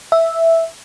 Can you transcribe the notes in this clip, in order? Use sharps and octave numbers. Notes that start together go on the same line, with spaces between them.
E5